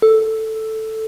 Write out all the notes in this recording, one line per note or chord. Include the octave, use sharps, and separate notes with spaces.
A4